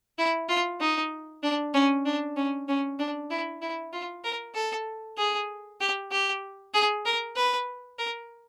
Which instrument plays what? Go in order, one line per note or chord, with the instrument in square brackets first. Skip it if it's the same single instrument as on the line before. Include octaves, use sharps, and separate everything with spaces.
[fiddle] E4
F4
D#4
D4
C#4
D4
C#4
C#4
D4
E4
E4
F4
A#4
A4
G#4
G4
G4
G#4
A#4
B4
A#4